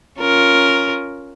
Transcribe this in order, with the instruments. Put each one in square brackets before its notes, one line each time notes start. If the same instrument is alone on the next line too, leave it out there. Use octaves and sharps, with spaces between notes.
[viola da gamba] C#4 F4 A#4